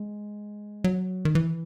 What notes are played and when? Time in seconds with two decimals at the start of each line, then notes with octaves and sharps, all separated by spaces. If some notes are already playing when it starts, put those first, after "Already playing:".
Already playing: G#3
0.84 F#3
1.25 D#3
1.35 E3